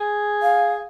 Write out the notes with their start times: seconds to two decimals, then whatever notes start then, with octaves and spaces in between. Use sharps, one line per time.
0.01 G#4
0.42 F5